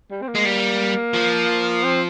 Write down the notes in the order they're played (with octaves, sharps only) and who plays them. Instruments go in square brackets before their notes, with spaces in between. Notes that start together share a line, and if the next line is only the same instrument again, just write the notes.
[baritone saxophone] G3
C4
A#3
[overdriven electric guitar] G#3
G3
F3
[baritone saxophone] C4